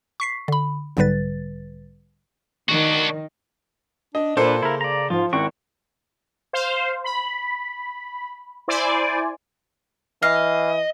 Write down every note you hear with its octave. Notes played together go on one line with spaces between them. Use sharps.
C#6 B6 C7
D3 B5
B1 G#2 D3 G3 B4 A6
D#3 D4 F#4
D4 D#5
A#2 A#3 D4 A4 B4 C5
C#3 E4 A#4
D5 A#5
G#2 F3 F4
G#1 E4 F#4 G5 C#6
C5 F5
B5
E4 C5 D5 G#5
E3 D#5 F5